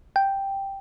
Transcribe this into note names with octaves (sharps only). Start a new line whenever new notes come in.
G5